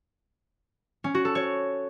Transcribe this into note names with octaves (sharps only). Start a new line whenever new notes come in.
C#4
F#4
A4
C#5